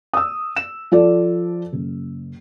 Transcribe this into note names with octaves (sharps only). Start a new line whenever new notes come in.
D#6 E6
E7
F3 F4 A4 D5
F#1